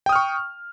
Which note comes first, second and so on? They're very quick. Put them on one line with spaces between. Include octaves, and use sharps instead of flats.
G5 D#6 F6 C#6